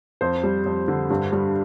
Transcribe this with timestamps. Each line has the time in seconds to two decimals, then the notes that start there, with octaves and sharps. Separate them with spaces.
0.21 F2 C5
0.43 G3
0.66 F2
0.88 D3
1.10 G2
1.32 G3